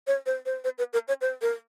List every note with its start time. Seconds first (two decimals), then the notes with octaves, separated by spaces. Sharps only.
0.07 C#5
0.26 C5
0.46 C5
0.64 C5
0.78 B4
0.93 A#4
1.08 C#5
1.21 C5
1.42 A#4